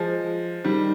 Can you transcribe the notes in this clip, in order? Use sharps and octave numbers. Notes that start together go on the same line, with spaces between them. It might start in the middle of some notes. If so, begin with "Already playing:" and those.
Already playing: F3 G#3
D#3 G3